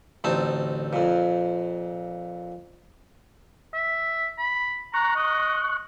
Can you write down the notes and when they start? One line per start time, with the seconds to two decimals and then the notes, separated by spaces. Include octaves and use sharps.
0.24 A1 D2 C4 D#4 A5
0.93 F2 A#2
3.74 E5
4.38 B5
4.94 A#5 C#6 F#6
5.16 D#5